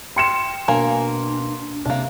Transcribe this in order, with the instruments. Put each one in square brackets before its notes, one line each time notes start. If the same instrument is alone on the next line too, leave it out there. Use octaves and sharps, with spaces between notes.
[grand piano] G5 [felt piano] C6 C#7 E7
[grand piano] B2 [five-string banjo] A#3 A#4 G#5 [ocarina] D4
[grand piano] C3 [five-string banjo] A#3 D4